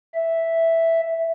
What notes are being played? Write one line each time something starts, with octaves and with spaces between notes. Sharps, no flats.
E5